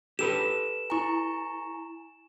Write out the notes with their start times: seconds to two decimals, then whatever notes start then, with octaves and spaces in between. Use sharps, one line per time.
0.19 G4 A4 B4 E7
0.90 E4 G#5 A#5 C#6